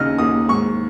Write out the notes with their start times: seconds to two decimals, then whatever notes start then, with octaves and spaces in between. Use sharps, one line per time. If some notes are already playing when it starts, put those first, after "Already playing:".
Already playing: D#2 C#3 D#4 D#5 F6
0.18 D#2 D#6
0.49 G#2 C#6